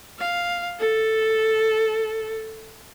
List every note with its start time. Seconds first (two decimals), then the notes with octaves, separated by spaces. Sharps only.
0.20 F5
0.80 A4